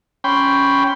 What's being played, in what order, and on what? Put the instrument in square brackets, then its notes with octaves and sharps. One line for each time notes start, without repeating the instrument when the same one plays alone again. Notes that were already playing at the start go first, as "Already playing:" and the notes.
[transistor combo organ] C#4 G5 B5 C6